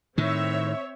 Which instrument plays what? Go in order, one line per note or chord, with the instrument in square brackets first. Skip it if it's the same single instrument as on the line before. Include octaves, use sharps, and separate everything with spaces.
[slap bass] A2 D#3 [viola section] C4 C#5 E5